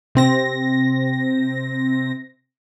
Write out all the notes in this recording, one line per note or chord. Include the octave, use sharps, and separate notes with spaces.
C3 C4 A#6